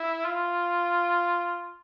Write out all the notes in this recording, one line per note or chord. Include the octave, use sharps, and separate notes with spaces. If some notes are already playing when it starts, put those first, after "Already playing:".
Already playing: E4
F4